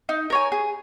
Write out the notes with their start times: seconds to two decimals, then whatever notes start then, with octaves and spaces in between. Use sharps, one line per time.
0.09 D#4
0.30 A#4 C#5 G#5
0.52 G#4